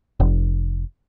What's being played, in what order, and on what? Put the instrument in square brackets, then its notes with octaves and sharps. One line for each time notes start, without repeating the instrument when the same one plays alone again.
[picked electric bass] F1